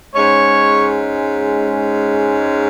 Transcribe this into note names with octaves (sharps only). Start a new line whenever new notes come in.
G#2 G#3 C#4 C#5